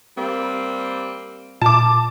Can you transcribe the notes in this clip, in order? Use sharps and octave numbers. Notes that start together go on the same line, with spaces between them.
G3 A#3 C4
A#2 A5 D6